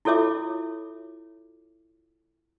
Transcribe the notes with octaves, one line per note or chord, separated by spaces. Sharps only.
E4 F4 A4 C#5 E5 D6